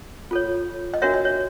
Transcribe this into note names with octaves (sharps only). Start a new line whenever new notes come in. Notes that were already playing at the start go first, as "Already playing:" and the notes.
F4 A4 C#5
D#5
D4 F#4 A#4 C#5 E5
D#5
C#5